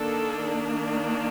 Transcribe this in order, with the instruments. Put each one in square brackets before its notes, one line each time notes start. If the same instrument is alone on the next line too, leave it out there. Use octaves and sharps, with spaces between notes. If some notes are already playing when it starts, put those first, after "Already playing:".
Already playing: [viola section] D#3 A#3 D4 A4